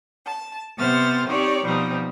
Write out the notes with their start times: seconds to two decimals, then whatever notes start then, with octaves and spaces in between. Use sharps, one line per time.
0.24 A5
0.77 C3 B3 C5 F6 A6
1.27 C4 D#4 G4 C#5 D5
1.64 B2 F3 G3 C4 D#4